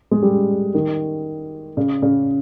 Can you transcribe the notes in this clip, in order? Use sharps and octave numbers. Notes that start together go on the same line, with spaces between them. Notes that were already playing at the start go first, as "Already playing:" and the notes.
G#3
G3
D#3
C#3
C#3